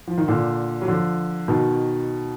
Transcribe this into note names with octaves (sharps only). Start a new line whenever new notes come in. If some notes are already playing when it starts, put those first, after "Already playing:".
F3
D#3
A#2 D3
F#3
D3 F3
B2 D#3